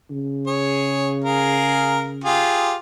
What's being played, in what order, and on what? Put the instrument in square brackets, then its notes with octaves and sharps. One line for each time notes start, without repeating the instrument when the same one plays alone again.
[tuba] C#3
[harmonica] G#4 C#5
G#4 A#4 F5
F4 G4 G#4